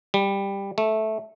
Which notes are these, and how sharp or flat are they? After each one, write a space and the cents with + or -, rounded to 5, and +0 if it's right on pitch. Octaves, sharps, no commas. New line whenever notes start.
G3 +10
A3 -10